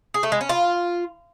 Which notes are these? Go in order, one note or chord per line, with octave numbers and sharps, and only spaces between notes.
G#4
A3
G#3
C#4
F4